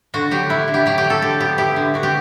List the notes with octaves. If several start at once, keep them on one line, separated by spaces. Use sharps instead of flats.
D3 F#4
F#3 G4
F#3 E4
D3
G4
F#3 G4
G4
F#3
A4
D3 G4
B3 G4
E4 G4
D3
D3 F#4
G4